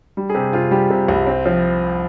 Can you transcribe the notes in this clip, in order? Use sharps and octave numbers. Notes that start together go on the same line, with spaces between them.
G3
G#4
C3 G4
C3 F4
G3 G4
C3
C2
C4
F3